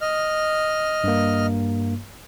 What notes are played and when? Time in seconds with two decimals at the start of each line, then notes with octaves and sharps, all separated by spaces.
0.01 D#5 F6
1.04 G2 A#3